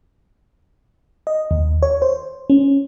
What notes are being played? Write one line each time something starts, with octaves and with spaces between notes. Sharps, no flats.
D#5
D#2
C#5
C5
C#4